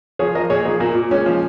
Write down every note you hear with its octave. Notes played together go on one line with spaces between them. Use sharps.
F3 G#4 C#5
F3 A#4 D#5
A#2 G#4 C#5
F3 D#4 G#4
A#2 A#3
A#2
A#2 G#3 C#4
F3